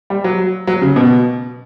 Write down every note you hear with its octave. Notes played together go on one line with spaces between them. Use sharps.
G3
F#3
F#3
C#3
B2